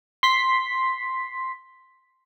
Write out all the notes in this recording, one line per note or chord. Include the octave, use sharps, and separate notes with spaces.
C6 B6